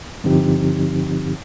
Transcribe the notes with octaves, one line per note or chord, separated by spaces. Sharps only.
G2 D3 F3 C4 D#4 G4